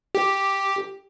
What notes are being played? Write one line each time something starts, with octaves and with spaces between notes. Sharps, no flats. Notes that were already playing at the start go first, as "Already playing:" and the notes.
G4